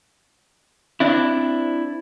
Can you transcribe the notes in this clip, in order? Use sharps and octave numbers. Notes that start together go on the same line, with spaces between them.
C4 D4 E4